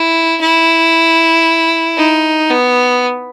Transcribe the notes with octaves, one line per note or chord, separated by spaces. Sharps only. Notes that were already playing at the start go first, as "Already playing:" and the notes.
Already playing: E4
E4
D#4
B3